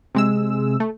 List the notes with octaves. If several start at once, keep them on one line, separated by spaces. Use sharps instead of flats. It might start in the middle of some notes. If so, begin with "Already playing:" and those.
C3 G#3 E6
A3